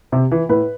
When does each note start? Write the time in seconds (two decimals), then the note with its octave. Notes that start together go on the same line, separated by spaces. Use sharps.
0.12 C3
0.31 E3
0.49 A2 B4